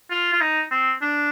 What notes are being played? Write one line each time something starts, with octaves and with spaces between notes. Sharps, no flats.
F4
F4
D#4
C4
D4